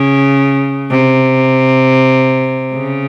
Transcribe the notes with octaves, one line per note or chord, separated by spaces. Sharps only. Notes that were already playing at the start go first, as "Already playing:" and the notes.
Already playing: C#3
C3
C#3